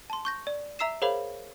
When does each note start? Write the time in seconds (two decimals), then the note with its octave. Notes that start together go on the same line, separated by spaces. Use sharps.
0.10 A5 C6
0.25 C#6 G6 A#6
0.47 D5
0.79 E5 A#5 E6 C7 E7
1.02 G#4 A#4 C5 C#5 F5 B5